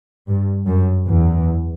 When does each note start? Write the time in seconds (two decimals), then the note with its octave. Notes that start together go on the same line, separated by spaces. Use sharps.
0.29 G2
0.67 F#2
1.06 E2